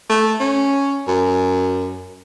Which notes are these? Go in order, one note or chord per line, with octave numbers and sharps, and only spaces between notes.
A3
C#4
F#2